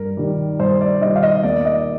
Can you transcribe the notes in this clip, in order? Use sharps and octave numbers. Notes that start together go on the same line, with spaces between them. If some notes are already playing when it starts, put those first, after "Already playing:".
Already playing: G2 A#4
D#3 G3
G2 C5
D5
D#3 G3 D#5
F5
D#5
D#2 D5
D#5